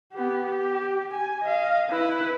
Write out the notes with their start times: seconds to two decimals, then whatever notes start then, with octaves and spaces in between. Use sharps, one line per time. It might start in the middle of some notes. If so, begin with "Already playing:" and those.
0.13 B3 G4
0.46 G4
1.13 G#5
1.42 D#5 F5
1.90 E4 B4